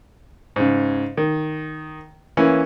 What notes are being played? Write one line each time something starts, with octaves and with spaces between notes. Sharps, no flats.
G#2 C#3
D#3
E3 A#3 C#4 E4